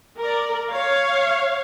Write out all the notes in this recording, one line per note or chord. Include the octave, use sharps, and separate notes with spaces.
A#4 D5
C#5 F5